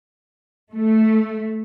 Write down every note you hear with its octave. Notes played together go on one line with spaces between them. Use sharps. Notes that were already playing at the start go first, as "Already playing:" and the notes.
A3